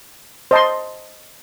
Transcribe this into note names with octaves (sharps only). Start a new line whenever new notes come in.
C5 D#5 A5 C6